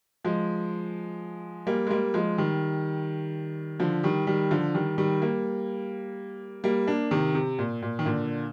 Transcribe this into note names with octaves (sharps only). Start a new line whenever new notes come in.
F3 G#3
G3 A#3
G#3
G3 A#3
F3 G#3
D#3 G3
D3 F3
D#3 G3
D#3 G3
D3 F3
D#3 G3
D#3 G3
G3 A#3
G3 A#3
A#3 D4
C3 D#3
C3
A#2
A#2
D#3
A#2 D3